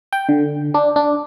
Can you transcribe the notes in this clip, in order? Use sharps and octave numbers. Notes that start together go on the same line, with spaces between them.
G5
D3
D4
D4